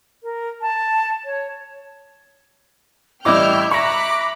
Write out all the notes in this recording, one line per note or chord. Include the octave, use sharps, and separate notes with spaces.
A#4
A5
C#5
A1 G3 E4 D#5 G5 D6 F6 G6
E5 A#5 B5 C#6 D6 F#6 A#6